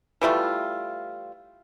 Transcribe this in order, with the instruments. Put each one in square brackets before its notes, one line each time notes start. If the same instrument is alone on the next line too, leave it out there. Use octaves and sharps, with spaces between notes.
[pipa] E3 G3 A3 F4